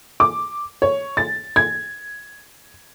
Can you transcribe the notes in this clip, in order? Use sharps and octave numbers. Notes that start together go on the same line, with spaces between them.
D6
C#5
A6
G#6